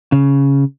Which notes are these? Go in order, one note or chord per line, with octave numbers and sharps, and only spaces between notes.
C#3